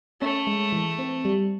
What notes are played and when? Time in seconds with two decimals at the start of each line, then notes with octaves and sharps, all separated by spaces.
0.21 A3 C#4
0.47 G#3
0.73 E3
0.99 C4
1.25 G3